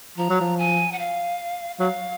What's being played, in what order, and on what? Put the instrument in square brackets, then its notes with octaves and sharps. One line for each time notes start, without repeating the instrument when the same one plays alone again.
[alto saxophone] F3 [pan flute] A#5
[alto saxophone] F#3
F3
[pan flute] G#5
F#5
F5
[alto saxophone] F#3 [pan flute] F5